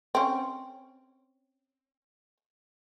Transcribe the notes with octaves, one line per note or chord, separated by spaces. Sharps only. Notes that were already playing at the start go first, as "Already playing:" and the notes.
C4 C#4